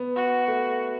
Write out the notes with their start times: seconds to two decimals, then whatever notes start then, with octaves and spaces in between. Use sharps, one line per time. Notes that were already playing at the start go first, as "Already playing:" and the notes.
Already playing: B3
0.16 F#4
0.48 A3